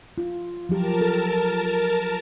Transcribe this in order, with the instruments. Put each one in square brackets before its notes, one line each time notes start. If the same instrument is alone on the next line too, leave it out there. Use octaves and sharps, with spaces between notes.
[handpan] F4
[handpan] F3 F#3 G4 [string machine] A#4 A5
[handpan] A4